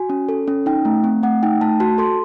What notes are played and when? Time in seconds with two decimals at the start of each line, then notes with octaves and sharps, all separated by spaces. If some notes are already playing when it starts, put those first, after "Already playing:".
Already playing: F#4 G#5
0.10 C#4
0.29 A4
0.48 C#4
0.66 D#4 G5
0.85 A3
1.04 C4
1.23 A3 F#5
1.43 D#4 G5
1.61 A3 A5
1.80 F#4 A5
1.98 A4 C6